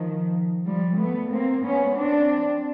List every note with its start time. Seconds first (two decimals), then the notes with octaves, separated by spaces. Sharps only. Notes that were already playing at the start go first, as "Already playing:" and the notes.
Already playing: D#3 F3
0.66 F3 G3
0.99 A3 B3
1.31 A#3 C4
1.64 B3 C#4
1.96 C4 D4